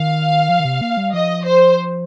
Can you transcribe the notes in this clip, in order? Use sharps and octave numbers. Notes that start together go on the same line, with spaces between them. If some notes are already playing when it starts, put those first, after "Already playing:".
Already playing: D#3 F5
F3
D#3
C3
A#3
G3
F3 D#5
C5